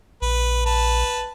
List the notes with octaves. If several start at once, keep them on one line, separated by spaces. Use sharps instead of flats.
A#1 B4
B4 A5